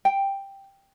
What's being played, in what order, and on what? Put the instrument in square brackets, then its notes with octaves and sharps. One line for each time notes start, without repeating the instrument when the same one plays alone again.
[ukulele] G5